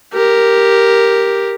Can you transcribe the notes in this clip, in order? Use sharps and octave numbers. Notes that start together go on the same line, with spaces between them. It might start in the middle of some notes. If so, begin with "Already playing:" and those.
G4 A#4